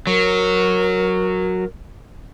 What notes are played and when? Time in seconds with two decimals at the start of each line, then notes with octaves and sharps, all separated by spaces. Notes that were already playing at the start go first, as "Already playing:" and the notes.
0.07 F#3 A#4